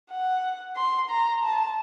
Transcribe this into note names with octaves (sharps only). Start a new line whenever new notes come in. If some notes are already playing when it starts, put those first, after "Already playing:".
F#5
C6
A#5
A5